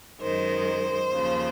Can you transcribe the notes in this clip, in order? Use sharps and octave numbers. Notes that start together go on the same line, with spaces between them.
F#2 D#3 G#3 C5
D#2 C#3 F3